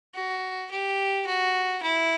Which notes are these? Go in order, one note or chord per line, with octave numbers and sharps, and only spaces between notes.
F#4
G4
F#4
E4